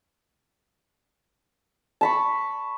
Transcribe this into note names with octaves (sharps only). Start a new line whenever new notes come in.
A5 B5 C#6